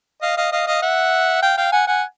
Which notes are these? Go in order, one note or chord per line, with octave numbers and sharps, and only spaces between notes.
D#5 F5
D#5 F5
D#5 F5
D#5 F5
E5 F#5
F5 G5
F5 G5
F#5 G#5
F#5 G#5